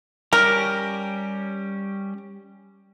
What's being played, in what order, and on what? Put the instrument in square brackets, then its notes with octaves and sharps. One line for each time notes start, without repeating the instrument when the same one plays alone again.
[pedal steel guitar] G3 C#4 G4 [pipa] A#4